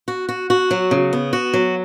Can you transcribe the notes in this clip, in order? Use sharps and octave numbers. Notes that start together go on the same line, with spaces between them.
F#4
F#4
F#4
F#3
C#3
B3
F#4
F#3